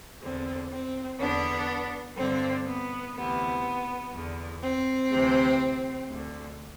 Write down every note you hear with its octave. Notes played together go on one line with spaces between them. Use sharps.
E2 D3 C4
C4
E2 D3 B3 D4
G2 D3 C4
B3
D2 C3 E3 B3
E2 D3
C4
D2 C3 E3
D2 D3